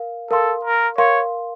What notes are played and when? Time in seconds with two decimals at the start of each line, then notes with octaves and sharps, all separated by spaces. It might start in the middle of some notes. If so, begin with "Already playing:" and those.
Already playing: A#4 F5
0.31 A4 A#4 F5 C6
0.65 A#4
0.98 A#4 C#5 F5 C6